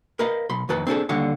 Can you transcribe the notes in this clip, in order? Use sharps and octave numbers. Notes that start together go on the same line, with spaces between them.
A#4 B4 D#5 F5
B1 B5 C6
F2 D#3 B4 A5
C4 D4 E4 G#4 A4
D#2 D3 G3 C#5 F5